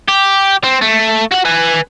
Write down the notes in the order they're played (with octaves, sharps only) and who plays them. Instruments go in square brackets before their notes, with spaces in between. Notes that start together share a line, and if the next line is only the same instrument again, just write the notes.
[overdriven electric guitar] G4
C4
A3
F#4 F#5
B4 G#5